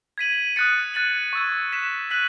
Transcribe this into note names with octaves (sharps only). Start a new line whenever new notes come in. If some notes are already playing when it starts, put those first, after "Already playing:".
G#6 B6 D#7 F#7
D#6 F#6 A6 C#7
F#6 A6 D#7 F#7
C#6 E6 G#6
F#6 B6 E7
F#6 B6 D#7 F#7